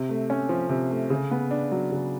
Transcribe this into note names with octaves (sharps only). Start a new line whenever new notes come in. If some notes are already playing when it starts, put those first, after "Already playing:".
Already playing: C3
A3
C#4
F3
C3
A3
C#3
B3
D4
F#3
C#3